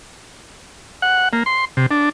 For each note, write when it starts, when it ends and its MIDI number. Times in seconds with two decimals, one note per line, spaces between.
1.02 1.29 78
1.33 1.43 58
1.46 1.65 84
1.77 1.86 48
1.91 2.09 62